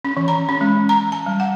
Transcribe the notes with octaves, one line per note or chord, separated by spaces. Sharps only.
C#4
E3
A#5
C#4
G#3
A#5
A5
G3
F#5